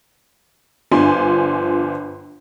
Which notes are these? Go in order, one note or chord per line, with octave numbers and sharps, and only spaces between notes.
G1 F3 D4 G#5 C6